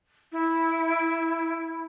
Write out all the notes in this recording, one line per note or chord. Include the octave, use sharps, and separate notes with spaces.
E4